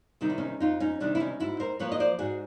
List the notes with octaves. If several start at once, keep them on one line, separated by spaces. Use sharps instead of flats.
C3 D#3 G3 D#4
E4
C#4 D#4
F2 D#4 F4
C#4 D#4
C3 D#3 G3 D4
E4
C#4 D#4
G#2 E4 F#4
A#4 C5
F3 A#3 B4 C#5
D#5
C5 D5
G#2 F#4 G#4